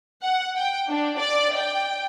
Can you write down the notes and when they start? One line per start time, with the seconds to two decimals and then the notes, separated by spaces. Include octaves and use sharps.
0.23 F#5
0.56 G5
0.89 D4
1.18 D5
1.56 G5